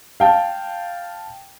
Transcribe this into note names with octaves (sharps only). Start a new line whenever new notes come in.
F5 G5 A5